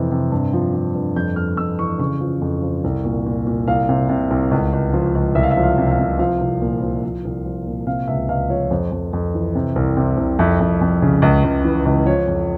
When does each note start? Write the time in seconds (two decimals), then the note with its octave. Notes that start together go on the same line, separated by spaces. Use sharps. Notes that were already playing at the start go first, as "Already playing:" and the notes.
Already playing: F2 C3 E3
0.12 C3
0.32 G2
0.53 F3
0.74 F3
0.94 G2
1.16 F2 G6
1.36 F2 F6
1.57 F2 E6
1.79 E3 C#6
1.99 C#3 C#6
2.21 F3
2.41 F2
2.62 F3
2.84 C2
3.05 A#2
3.26 A#2
3.47 A#2
3.68 C2 F5
3.89 C3
4.09 C3
4.30 C2
4.51 C#2
4.73 C#2
4.93 F3
5.15 C#2
5.35 C2 E5
5.43 F5
5.51 E5
5.57 F3
5.63 F5
5.78 C3
5.91 F5
5.99 C3
6.19 F3 F5
6.41 C2
6.61 A#2
6.82 F3
7.03 F3
7.25 C2
7.45 F3
7.67 A#2
7.86 C3 F5
8.08 C#2 E5
8.29 C#2 F5
8.50 F3 C#5
8.70 F2 C5
8.91 F2
9.13 F2
9.34 E3
9.55 C3
9.76 C2
9.97 C3
10.17 C2
10.39 F2 E5
10.60 F2
10.81 F2
11.02 C#3
11.22 C#2
11.44 C#2
11.64 E3
11.85 C#2
12.06 F3 C#5
12.27 F2